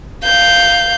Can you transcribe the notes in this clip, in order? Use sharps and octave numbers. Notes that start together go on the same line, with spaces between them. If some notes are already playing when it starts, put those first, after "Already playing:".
F5 G6